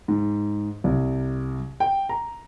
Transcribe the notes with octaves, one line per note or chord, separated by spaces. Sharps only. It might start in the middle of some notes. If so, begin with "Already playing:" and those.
G#2
C2
G5
A#5